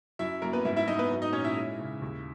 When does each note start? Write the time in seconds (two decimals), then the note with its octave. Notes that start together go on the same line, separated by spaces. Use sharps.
0.19 F#2 E4 E5
0.42 F#2 A#3 A#4
0.53 B3 B4
0.65 G#2 E4 E5
0.76 E4 E5
0.87 G#2 D#4 D#5
0.99 B3 B4
1.11 F#3
1.22 D#4 D#5
1.33 A#2 C#4 C#5
1.44 E4 E5
1.56 G#3
1.79 C#3
2.02 D#2